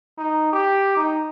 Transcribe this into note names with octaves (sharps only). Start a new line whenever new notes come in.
D#4
G4
D#4